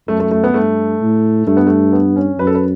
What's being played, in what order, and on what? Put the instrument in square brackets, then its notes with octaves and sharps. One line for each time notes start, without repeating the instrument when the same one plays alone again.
[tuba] F#2 [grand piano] A3
[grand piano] A3
A3
B3
[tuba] G2 [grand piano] A3
[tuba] A2
[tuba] G2 [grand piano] A3
[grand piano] B3
A3
B3
C#4
[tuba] F#2 [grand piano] B4
[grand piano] A4
B4